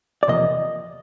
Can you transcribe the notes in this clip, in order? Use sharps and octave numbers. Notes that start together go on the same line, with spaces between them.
D5
E2 C3 F3 A#3 D#5